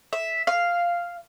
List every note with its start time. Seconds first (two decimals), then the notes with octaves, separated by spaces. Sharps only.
0.13 E5
0.47 F5